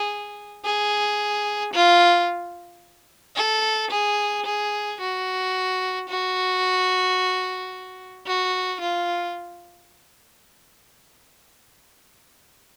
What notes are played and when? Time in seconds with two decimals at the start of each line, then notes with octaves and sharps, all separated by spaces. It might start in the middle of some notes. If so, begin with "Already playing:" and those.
Already playing: G#4
0.64 G#4
1.73 F4
3.36 A4
3.91 G#4
4.46 G#4
5.00 F#4
6.09 F#4
8.27 F#4
8.81 F4